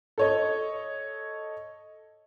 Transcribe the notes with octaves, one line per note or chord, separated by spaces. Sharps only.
A4 C#5 D#5